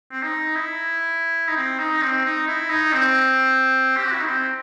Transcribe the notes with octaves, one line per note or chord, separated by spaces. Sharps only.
C4
D#4
E4
D#4
C4
D#4
C4
D#4
E4
D#4
C4
G4
F#4
E4
D#4
C4